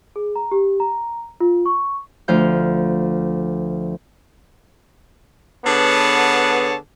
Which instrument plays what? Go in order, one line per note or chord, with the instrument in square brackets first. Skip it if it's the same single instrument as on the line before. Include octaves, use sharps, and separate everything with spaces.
[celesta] G#4
A#5
G4
A#5
F4
C#6
[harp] D2 F3 F5 G6
[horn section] D3 B3 G#4 B4 C#5 A5